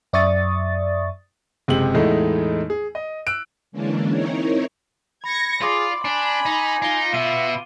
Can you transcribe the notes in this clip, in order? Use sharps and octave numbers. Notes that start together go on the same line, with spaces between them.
F#2 D5 E5 C#6 D#6 A6
F#1 C3 G#3 G4 F#7
E2 A2 G#3 A3 D#4 E4
G#4
D#5
E6 F#6 D7
D3 E3 G#3 A#3 C#4 D4
C4 D#4 E4 A#4 C#5
B5 G#6 A#6 C#7
F4 G#4 D5 C6 D6
D4 G#5 B5
D#4
D#4 F4 C7 D7 G7
B2 B3 E5 D#7